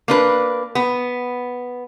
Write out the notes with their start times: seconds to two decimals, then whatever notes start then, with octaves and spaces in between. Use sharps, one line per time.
0.08 A#3 D4 B4
0.75 B3